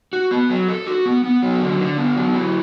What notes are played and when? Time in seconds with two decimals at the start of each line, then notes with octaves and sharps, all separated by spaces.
0.13 F#4
0.31 B3
0.50 F#3
0.68 A4
0.87 F#4
1.06 B3
1.24 B3
1.42 F#3
1.61 D3
1.80 D3
1.98 B3
2.16 F#3
2.35 E4